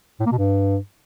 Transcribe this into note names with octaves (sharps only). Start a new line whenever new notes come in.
A2
A#3
B2
G2